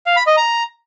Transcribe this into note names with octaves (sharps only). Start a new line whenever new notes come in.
F5
B5
D#5
A#5